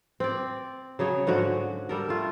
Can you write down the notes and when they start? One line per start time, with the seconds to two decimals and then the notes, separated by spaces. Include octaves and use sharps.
0.20 C4 D5
0.99 C#3 F#3 G#4 C#5
1.27 G#2 D3 F#3 F#4
1.89 G3 A4 A#4
2.09 A3 F4